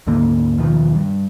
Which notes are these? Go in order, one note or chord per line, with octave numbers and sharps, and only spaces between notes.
D2 G#2 D3 A#3
D#2 B2 D#3 F3
G2